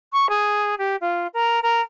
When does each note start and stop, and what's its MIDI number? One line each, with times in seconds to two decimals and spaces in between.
0.13 0.29 85
0.29 0.75 68
0.78 0.96 67
1.01 1.27 65
1.34 1.60 70
1.63 1.81 70